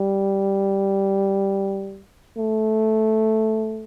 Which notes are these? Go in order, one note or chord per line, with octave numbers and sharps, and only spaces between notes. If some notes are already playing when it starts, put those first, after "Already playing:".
Already playing: G3
A3